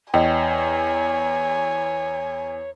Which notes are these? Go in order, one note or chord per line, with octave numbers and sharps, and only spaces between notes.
E2 C#5 D#5 G5 G#5